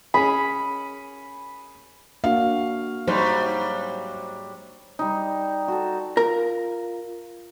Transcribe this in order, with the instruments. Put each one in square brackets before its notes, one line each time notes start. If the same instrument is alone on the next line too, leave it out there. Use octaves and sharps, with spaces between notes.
[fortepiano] C#4 G#4 [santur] B5
[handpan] A#3 D4 F#4 [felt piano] F5
[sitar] G#2 F#3 G3 [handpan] C5
[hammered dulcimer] G3 D#4
F#4 A4
[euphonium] F4 [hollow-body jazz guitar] A#4 A#5